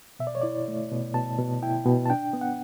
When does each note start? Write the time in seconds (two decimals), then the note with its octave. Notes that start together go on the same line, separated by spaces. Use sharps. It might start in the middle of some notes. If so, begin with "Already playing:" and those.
0.19 B2 E5
0.27 D5
0.35 C#5
0.42 E4 D5
0.68 A3
0.91 B2
1.14 B2 A5
1.39 B2
1.62 E4 G5
1.86 B2
2.06 A5
2.10 D4 G5
2.33 B3
2.41 F#5